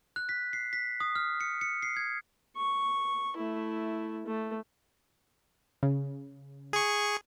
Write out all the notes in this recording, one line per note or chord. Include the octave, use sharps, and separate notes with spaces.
F#6
B6
C7
B6
D#6
F6
C#7
C#7
C7
G#6
C#6
A3 E4
A3
C#3
G#4 C#6